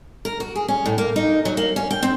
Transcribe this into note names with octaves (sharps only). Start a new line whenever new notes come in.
A#4
F#4
G#4
C#4
A2
A#3
D#4
F#3
A#3
C#4
G5
C4